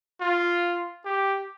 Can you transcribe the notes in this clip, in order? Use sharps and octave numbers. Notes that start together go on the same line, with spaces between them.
F4
G4